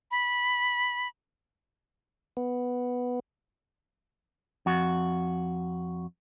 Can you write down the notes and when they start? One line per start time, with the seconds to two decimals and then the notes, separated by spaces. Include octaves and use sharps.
0.11 B5
2.37 B3
4.66 F2 F#4